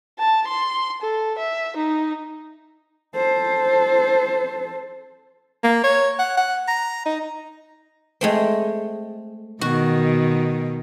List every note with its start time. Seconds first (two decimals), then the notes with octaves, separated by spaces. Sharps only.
0.19 A5
0.48 C6
1.02 A4
1.38 E5
1.77 D#4
3.15 A4 C5
5.64 A#3
5.84 C#5
6.19 F#5
6.37 F#5
6.68 A#5
7.06 D#4
8.21 G#3 A3 C4
9.61 B2 D#3 F#4